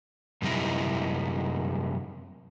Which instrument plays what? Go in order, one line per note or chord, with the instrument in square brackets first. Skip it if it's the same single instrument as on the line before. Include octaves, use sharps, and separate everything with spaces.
[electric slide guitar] F#2 C3 G3 D#4 E4